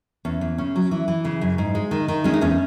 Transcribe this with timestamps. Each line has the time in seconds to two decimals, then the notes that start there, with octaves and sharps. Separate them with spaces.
0.25 E2 C#4
0.41 E2
0.58 C#3 C#4
0.76 F#3
0.91 E3
1.08 E3
1.25 C#3
1.41 F#2
1.58 G#2
1.75 G#3
1.91 D#3
2.08 D#3
2.24 G#3 C#4
2.33 D#4
2.41 E2 C#4